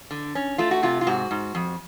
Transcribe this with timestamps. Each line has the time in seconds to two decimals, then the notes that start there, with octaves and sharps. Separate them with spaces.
0.11 D3
0.35 C#4
0.58 A3 F4
0.71 F#4
0.83 C3 F4
1.01 F4
1.07 G#2 F#4
1.31 G#2
1.55 F2